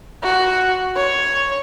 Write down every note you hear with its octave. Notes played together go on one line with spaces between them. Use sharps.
F#4
C#5